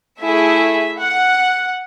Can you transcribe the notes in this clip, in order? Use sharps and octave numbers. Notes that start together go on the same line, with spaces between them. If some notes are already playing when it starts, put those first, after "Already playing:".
A3 E4 G#4 E5
F#5